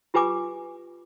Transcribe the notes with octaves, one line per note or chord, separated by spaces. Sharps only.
F4 G4 B4 G#5 D6